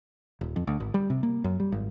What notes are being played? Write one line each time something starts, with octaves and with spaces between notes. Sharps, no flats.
D#1
F2
D2
G#1
G3
C3
A#3
F#2
G3
G#1